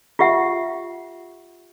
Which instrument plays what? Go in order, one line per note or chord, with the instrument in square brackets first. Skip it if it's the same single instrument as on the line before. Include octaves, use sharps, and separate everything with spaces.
[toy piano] F4 G4 E5 F#5